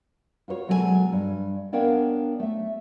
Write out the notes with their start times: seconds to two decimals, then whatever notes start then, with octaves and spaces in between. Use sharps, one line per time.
0.48 F4 F#4 C5 C#5
0.68 B2 F#3 G#3 A4 B4 G#5
1.12 G2
1.73 B3 D4 A#4 C#5 F5 G5
2.40 A3 E5